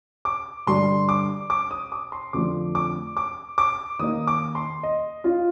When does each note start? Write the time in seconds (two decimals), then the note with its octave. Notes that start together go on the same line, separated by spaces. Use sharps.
0.25 D6
0.67 G2 D3 G3 C6
1.09 D6
1.50 D6
1.71 D#6
1.92 D6
2.12 C6
2.33 F2 D3 F3 A3 C4 D6
2.75 D6
3.17 D6
3.58 D6
3.99 D#3 A#3 D#4 D#6
4.27 D6
4.55 C6
4.83 D#5
5.24 F4